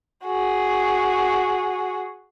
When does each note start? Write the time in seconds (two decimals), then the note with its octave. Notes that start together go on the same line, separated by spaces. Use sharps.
0.24 F#4 G#4